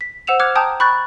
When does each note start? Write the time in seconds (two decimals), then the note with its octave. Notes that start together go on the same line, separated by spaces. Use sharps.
0.01 B6
0.27 C5 F#5 E6 E7 F7
0.40 D6 F6 F#6 G#6 C#7
0.56 G5 A5 A#5 D#6 G6
0.80 B5 C#6 F#6 G6 A6